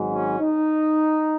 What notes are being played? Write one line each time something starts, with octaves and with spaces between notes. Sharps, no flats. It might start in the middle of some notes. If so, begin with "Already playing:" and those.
Already playing: G#1 G#2 F#3
C#4
D#4